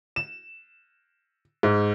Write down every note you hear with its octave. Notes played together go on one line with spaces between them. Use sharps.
E7
G#2